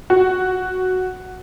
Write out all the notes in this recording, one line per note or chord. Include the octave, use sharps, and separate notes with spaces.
F#4